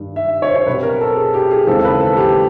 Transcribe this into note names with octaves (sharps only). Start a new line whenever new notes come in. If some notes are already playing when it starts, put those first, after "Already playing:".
Already playing: G2 D#3 G3
E5
C#5
C5
C#5
B2 G3 C4 B4
A#4
A4
G#4
G4
G#4
D#2 C#3 E3 G#3 C4 A4
B4
A4
G4